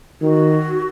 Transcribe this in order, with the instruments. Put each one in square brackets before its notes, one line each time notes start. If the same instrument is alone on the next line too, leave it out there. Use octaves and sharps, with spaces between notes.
[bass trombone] D#3 [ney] F#4